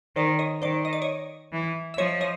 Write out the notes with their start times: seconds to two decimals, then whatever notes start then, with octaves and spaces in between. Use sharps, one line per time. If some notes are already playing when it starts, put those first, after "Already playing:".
0.16 D#3 C5 D5
0.39 C#5 D#5
0.62 D#3 C5 D5
0.85 D#5
0.93 D5
1.02 C#5 D#5
1.52 E3
1.94 E5
1.98 F3 C#5 D#5
2.21 C#5 D#5